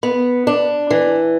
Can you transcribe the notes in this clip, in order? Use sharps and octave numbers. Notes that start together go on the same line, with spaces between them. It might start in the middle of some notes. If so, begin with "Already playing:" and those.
B3
D4
E3